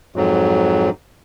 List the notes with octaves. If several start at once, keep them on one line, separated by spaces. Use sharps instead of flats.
F2 G#2 F#3